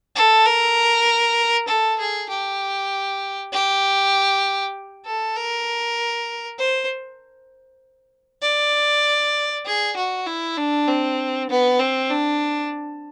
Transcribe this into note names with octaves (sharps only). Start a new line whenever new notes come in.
A4
A#4
A4
G#4
G4
G4
A4
A#4
C5
D5
G#4
F#4
E4
D4
C4
B3
C4
D4